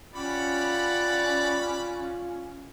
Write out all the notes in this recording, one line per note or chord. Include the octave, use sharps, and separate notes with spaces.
C#4 F4 G4 D5 F#5 B5